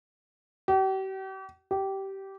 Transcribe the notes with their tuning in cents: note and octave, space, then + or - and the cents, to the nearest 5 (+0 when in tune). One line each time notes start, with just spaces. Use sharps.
G4 -40
G4 -15